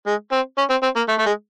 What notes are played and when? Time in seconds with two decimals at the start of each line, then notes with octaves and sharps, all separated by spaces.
0.06 G#3
0.32 C4
0.58 C#4
0.70 C4
0.83 C4
0.96 A#3
1.09 A3
1.19 A3
1.26 G#3